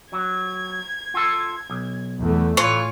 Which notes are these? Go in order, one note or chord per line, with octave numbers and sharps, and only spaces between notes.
F#3 G#6
F4 A4
B1
E2 A3
A2 E3 F4 C#5 G#5